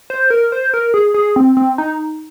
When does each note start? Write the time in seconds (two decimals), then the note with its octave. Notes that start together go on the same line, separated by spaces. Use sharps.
0.10 C5
0.30 A#4
0.52 C5
0.74 A#4
0.94 G#4
1.14 G#4
1.36 C4
1.57 C4
1.78 D#4